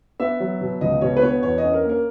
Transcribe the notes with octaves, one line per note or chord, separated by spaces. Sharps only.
B3 E5
F#3
B2
C#2 D#5
B2 C#5
B4
B3 C#5
E2 C#5
D#5
C#4
A#4
A#3
A#4